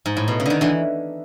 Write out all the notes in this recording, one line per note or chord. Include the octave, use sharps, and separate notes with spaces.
G#2
A2
B2
C#3
D3 D#3
D3 E3